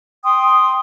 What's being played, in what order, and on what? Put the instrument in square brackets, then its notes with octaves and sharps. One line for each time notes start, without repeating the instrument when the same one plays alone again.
[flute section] G5 C6 D#6